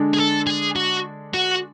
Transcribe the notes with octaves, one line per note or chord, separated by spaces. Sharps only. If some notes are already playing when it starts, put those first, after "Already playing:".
Already playing: D3 G#3 D4
G#4
A4
G#4
F#4
F#4